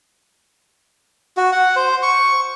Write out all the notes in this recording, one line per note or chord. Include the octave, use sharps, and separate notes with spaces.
F#4
F#5
C5
C#6